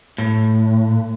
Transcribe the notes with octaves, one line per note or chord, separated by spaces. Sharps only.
A2